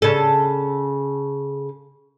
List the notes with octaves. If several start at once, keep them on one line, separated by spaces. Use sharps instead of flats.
C#3 A4